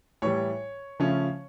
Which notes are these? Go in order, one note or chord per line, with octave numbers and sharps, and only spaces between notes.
A2 E3 G3 C#5
C#3 F3 A3 C#4